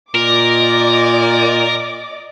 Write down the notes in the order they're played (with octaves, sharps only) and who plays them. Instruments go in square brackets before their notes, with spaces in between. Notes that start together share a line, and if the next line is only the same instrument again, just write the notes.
[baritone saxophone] A#2 [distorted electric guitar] A#4 [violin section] D5 D#5 D6